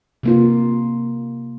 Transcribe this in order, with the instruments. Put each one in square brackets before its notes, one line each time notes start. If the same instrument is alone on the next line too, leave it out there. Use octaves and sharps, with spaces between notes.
[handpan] C3 A#3 F4